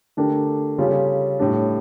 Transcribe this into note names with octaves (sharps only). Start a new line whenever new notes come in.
D3 A3 D4 G4 A#4
C#3 G3 C#4 F4 A4
A2 G3 D4